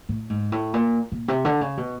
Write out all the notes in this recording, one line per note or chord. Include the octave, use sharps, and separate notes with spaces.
A2
G#2
A2
A#2
A#2
C3
D3
C#3
B2